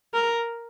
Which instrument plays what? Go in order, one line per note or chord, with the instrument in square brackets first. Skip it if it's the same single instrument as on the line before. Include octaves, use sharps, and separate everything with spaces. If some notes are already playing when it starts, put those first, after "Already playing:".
[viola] A#4